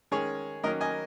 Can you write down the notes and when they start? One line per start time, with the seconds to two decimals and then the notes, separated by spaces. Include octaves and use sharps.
0.12 D#3 G#3 C#4 G#4 C#5
0.64 D#3 F#3 A#3 C#4 A#4 D#5
0.81 D#5 G#5